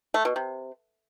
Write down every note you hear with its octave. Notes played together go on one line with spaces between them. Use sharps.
A3
B2
C3